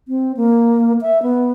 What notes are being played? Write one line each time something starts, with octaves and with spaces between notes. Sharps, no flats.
C4
A#3
E5
B3